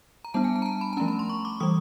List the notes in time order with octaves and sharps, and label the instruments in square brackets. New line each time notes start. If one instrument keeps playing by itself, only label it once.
[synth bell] A#5
G3 B3 D4 A5
G#5
A5
A#5
A5
B5
A5
F3 A3 C#4 A#5
B5
C6
C#6
D6
E3 G3 D#6